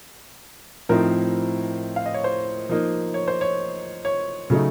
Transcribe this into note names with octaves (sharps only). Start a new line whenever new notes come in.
A2 F3 C4 D#4 A#4
F5
D#5
C#5
C5
F3 A#3 D#4
C#5
C5
C#5
C#5
C#3 F#3 A3 D#4